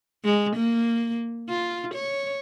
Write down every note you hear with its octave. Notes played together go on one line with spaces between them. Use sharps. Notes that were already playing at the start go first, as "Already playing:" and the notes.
G#3
A#3
F4
C#5